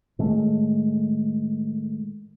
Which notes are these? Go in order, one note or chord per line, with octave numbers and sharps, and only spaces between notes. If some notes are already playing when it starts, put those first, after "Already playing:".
A2 D#3 G#3 A3